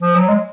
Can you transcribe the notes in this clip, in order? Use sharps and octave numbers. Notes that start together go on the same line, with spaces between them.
F3
F#3
G#3